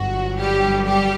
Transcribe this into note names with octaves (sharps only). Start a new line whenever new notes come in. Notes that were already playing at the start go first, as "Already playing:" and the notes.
Already playing: G1 G2 F#3 F#4
G3 G4
G3 G4